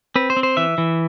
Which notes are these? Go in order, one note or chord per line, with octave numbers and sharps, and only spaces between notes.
C4 B4
C5
C4
C5
E3 E5
E3